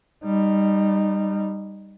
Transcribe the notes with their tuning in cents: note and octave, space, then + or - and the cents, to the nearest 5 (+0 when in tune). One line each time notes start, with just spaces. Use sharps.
G3 +10 D#4 -15